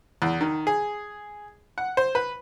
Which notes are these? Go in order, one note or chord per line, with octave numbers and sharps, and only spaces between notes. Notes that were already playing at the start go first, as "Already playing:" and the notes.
E2
D#3
G#4
F#5
C5
B4